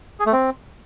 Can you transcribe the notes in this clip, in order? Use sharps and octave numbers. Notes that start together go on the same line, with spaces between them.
G#4
A3
C4